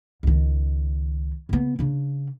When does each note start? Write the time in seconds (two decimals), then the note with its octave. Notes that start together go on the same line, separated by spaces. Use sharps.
0.23 C#2 D#3
1.49 C#3 B3
1.79 C#3 D4